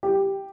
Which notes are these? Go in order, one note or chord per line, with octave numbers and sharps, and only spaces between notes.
G4